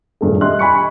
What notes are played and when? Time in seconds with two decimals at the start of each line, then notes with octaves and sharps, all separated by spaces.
0.21 D#1 G2 A3 G#4
0.41 G4 D#5 E5 C6 F#6
0.59 G#5 B5 C#6 C#7